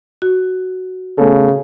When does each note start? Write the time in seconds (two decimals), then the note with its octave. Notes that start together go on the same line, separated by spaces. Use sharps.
0.22 F#4
1.18 C#3 A3 B3 A4